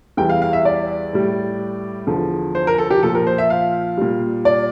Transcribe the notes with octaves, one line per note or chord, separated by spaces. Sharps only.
E2 E3 G3 G5
F5
F5
E5
D5
A2 G3
E2 D3 F3
C5
A#4
A4
G4
A#2 F3 A4
A#4
C5
E5
F5
A#2 G3
D5